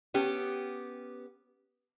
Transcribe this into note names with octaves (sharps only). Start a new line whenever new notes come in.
B3 C#4 G4